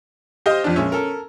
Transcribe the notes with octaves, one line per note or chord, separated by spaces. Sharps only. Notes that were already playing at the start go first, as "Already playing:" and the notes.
G4 C5 D#5 F5
F2 D4
A#1 G#3 C#4 E5
A4 A#4